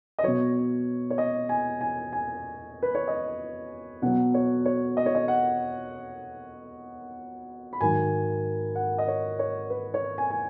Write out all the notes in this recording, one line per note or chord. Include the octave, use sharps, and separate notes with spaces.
D#5
B2 F#3 C#5
C#5
D#5
G#5
G#5
G#5
B4
C#5
D#5
B2 F#3 F#5
C#5
C#5
D#5
C#5
D#5
F#5
B5
G#2 D#3 F#3 G#5
F#5
D#5
C#5
C#5
B4
C#5
G#5
G#5